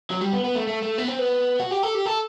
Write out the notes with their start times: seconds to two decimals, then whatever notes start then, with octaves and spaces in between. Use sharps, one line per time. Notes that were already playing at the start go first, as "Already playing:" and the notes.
0.11 F#3
0.21 G3
0.33 B3
0.44 B3
0.55 A3
0.67 A3
0.82 A3
0.98 B3
1.08 C4
1.19 B3
1.60 F#4
1.71 G4
1.83 A4
1.95 G4
2.06 A4